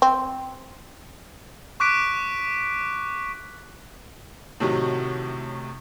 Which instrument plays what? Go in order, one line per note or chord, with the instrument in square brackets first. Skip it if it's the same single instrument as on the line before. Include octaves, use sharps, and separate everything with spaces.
[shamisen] C4
[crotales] C#6 D6 F#6 B6 D7
[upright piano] A2 C3 D#3 F#3